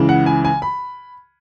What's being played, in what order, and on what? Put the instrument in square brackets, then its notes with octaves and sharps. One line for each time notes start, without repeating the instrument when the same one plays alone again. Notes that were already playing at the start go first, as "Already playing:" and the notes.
Already playing: [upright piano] C#2 C#3 E3
F#5
G#5
G#5
B5